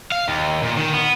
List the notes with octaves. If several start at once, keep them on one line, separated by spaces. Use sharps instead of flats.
F5
D#2
A#2
D#3
B3